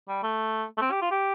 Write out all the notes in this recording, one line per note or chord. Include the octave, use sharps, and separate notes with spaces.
G3
A3
A3
C4
G4
F4
G4